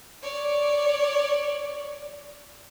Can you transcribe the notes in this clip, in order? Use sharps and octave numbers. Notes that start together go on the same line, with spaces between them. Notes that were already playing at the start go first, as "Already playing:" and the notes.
C#5 D5